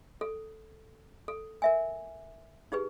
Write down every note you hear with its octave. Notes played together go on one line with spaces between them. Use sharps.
A4
A4
A#4 E5 G#5
D#4 G4 G#4 B4